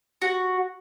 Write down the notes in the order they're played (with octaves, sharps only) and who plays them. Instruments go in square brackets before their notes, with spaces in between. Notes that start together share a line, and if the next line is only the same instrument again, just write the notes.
[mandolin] F#4